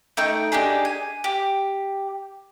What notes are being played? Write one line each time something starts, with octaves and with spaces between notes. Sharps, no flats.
A3 D#4 G5
D4 D#4 G4 G#4
G#5
G4